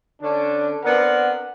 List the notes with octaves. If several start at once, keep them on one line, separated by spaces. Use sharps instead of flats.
D3 C#4 D4
B3 C4 D4 A#4 F#5